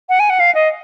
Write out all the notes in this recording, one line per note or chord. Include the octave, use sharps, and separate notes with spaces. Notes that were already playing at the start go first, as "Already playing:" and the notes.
F#5
G#5
F#5
F5
D#5